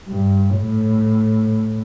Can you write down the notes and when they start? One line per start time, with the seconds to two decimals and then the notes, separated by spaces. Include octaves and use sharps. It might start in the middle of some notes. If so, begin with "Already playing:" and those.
0.08 G2
0.56 A2